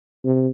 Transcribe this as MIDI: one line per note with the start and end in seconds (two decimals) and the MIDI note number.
0.24 0.48 48